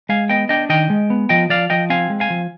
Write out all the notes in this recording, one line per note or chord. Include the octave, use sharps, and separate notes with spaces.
G#3 F5 G#5
B3 D#5 G5
D4 D#5 G5
D#3 D#5 G5
G#3
B3
F3 D#5 G5
F3 D5 F5
F3 D#5 G5
C4 F5 G#5
G#3
F5 G#5
F3